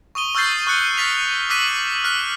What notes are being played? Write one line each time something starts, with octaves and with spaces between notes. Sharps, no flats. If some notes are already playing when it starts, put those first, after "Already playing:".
C#6 D#6 D#7 G7
C#6 E6 F6 G6 A6 C7
C#6 F#6 C#7 G7
F6 A6 B6 F7
D6 E6 F#6 B6 D#7 F#7
F6 F#6 B6 D#7